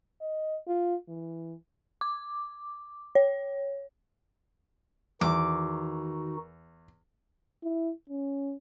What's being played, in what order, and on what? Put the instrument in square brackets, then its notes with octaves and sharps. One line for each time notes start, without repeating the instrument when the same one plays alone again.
[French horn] D#5
F4
E3
[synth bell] D6
C#5
[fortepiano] E2 [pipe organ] D#3 D#4 F#4 [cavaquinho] D6
[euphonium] E4
C#4